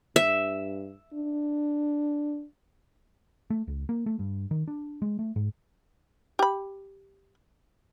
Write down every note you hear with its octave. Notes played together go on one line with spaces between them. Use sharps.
G2 E5
D4
A3
C#2
A#3
A3
G2
D#3
D4
G#3
A3
G#2
G4 B5